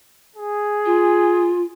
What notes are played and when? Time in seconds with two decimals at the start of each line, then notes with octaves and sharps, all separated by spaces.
0.36 G#4
0.86 F4